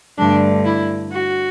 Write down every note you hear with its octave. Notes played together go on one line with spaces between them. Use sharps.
G2 D3 A3 D4
E4
F#4